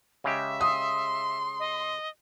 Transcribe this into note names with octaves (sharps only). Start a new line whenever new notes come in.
C#3 G#3 G4 E5
C6 D#6
D#5